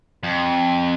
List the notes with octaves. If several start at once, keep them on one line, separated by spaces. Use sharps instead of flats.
F2